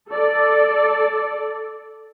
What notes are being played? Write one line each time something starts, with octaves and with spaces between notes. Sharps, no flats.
A4 D5